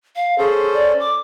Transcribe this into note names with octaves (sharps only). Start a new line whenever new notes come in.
F5
C#4 G#4 A4 C5
D5
D6